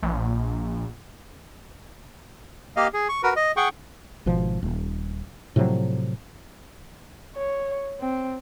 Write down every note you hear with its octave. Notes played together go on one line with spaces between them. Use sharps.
A#1
A#3 G4 D#5 F5
G#4
C#6
F#4 A#4 B4
D#5
G#4 F#5 G5 C#6
G#1 B2 F3
D#1
A2 C3 F3 F#3
C#5
C4